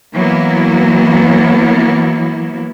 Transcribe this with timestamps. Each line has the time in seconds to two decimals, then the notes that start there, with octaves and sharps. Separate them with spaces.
0.13 E3 F#3 A#3 B3 E4